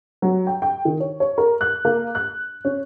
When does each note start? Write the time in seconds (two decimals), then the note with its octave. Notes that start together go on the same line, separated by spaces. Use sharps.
0.22 F#3
0.47 G5
0.62 G5
0.85 D#3
1.00 C#5
1.20 C#5
1.38 A#4
1.61 F#6
1.85 A#3
2.15 F#6
2.65 C#4